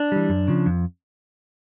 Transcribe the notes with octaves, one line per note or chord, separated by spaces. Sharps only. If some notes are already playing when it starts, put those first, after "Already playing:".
Already playing: D4
E3 G3
F#2
C#3 F3
F2